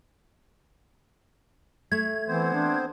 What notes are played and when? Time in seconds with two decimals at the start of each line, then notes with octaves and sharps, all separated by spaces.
1.92 A3 G#6
2.28 E3 B3 C4 C5
2.54 D4